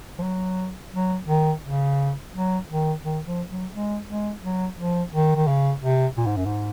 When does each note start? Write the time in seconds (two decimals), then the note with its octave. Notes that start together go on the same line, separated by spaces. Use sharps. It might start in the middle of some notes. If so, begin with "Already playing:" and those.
0.18 F3
0.23 F#3
0.93 F#3
1.28 D#3
1.63 C#3
2.33 F#3
2.68 D#3
3.03 D#3
3.26 F3
3.50 F#3
3.73 G#3
4.07 G#3
4.42 F#3
4.78 F3
5.13 D#3
5.36 D#3
5.47 C#3
5.82 C3
6.17 A#2
6.26 G#2
6.37 F#2
6.46 G#2